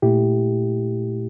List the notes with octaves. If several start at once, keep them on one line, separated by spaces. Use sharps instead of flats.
A#2 A3 E4 G4